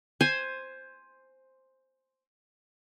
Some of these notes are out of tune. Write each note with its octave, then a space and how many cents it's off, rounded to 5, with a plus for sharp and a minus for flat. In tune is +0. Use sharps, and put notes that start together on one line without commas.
C5 +5 G#5 +0